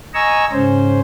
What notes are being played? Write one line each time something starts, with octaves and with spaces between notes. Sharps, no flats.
D#5 G#5 A#5 C#6 E6
G#2 C#3 C#4 C5